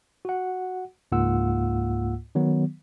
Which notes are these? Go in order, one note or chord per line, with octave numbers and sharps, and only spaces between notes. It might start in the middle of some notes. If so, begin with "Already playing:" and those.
F#4 F#5
C#2 G#2 A#3 F4 F#5 E6
D#3 F#3 B3